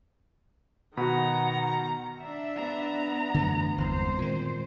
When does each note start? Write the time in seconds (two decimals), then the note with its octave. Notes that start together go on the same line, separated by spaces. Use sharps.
0.97 B2 D#3 F#4 F#5 A#5 B5
2.19 D4 E5
2.56 B3 A#5
3.34 F#2 D3 E3 A3
3.78 G1 E2 G#3 C4 C5
4.18 A#2 D#3